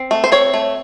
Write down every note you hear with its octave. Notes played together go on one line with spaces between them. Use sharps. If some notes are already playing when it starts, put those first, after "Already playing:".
Already playing: C4
A3
C5
C4 C#5
A3